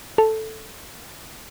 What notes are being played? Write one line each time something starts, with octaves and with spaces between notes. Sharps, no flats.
A4